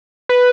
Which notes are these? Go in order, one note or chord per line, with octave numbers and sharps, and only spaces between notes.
B4